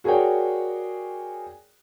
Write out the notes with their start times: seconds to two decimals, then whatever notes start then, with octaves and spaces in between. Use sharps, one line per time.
0.04 F#4 G#4 A#4 C#5 D5 G5